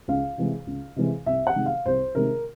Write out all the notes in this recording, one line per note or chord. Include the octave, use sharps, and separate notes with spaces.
C#2 F5
C3 E3 G#3
C#2
C3 E3 G#3
C2 E5
F#5
C3 D#3 G#3
F5
C2 C5
C3 D#3 G#3 A#4